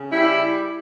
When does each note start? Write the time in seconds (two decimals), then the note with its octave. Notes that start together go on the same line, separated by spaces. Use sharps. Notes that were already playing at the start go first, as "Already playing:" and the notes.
Already playing: C#3
0.11 G3 E4